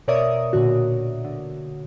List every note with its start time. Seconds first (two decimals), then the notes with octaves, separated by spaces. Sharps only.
0.08 B2 A#4 C#5 D5 E5 D#6
0.53 A#2 D3 F#4
1.25 D3